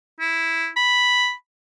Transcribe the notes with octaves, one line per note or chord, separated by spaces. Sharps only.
E4
B5